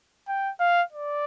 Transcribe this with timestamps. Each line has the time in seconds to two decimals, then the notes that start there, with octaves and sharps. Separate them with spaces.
0.29 G5
0.60 F5
0.92 D5